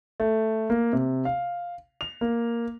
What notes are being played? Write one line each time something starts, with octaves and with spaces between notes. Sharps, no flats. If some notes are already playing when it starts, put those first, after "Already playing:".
A3
A#3
C3
F5
F7
A#3